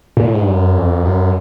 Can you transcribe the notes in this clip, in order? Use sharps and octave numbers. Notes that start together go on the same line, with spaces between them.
A#2
A2
G#2
G2
F#2
F2
F#2